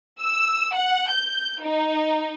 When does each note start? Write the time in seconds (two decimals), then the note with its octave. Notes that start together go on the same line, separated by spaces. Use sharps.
0.21 E6
0.76 F#5
1.11 G6
1.64 D#4